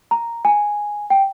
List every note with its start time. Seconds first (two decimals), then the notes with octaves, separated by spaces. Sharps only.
0.11 A#5
0.45 G#5
1.10 G5